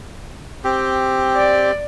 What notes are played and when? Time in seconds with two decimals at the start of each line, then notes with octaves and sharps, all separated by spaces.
0.64 C4 G4
1.36 D5